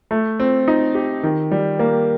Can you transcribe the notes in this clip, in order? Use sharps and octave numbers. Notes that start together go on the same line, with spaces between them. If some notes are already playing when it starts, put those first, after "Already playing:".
A3
C4
D#4
G4
D#3
G3
A#3